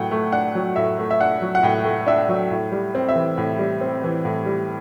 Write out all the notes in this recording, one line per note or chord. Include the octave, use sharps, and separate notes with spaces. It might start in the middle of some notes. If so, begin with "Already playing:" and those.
Already playing: A2 F#3 F#5 G5
A3
D4 F#5
F#3
A2 E5
A3
E5
D4 F#5
F#3
F#5
A2 G5
A3
D4 E5
F#3
A2
G3
C4
E5
E3
A2
G3
C4
E3
A2
G3